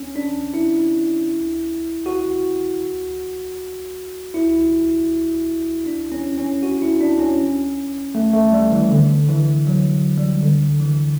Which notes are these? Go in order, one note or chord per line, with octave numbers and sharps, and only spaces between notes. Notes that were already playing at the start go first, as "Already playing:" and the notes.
Already playing: C#4
D4
E4
F#4
E4
D4
C#4
C#4
F#4
E4
D4
C#4
A3
A3
G3
E3
D3
E3
F#3
G3
D3
E3